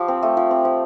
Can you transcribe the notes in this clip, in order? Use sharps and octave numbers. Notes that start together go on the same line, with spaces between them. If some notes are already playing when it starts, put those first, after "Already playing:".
Already playing: F3 G4
C4
A3
F3
C4
F3